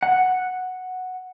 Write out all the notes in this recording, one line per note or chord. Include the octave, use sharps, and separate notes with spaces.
F#5